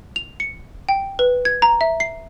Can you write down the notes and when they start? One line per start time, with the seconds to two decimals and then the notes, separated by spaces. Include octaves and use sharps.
0.16 F7
0.40 C#7
0.89 G5
1.19 B4
1.45 G#6
1.62 A#5
1.81 E5
2.00 C7